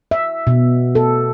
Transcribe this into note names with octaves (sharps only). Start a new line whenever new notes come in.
E5
B2
A4